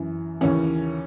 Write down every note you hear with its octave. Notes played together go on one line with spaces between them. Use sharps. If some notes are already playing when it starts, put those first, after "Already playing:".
Already playing: F#2 E3
D#2 C#3 E3 C#4